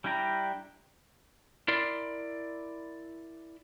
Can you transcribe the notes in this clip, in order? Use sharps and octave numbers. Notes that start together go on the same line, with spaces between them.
G3 D4 E4 G5 A#5
E4 A#4 D5 C6